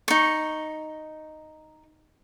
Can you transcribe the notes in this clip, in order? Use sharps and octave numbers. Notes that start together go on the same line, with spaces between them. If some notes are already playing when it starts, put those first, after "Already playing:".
D#4 C#6